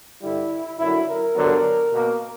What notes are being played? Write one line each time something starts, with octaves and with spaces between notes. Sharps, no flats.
G2 D3 G3 E4
F#2 D3 F#3 E4
A#4
G2 D3 F#3 B3
B2 A#3